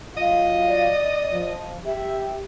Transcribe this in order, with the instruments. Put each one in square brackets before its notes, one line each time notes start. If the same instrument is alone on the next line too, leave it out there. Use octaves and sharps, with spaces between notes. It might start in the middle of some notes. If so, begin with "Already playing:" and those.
[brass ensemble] F#3 F4 F5 [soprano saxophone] D#5
[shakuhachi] D5
[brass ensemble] F3
[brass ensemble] G4 [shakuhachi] E5